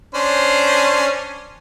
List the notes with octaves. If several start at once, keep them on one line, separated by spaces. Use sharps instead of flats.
C#4 D4 C5